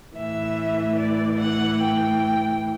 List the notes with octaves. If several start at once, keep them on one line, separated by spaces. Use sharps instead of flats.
A2 E3 E5
D5
F#5
G5